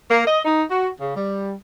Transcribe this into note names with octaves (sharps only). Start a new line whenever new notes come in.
A#3
D#5
D#4
F#4
C#3
G3